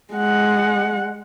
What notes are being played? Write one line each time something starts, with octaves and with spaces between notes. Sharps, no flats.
G#3 F#5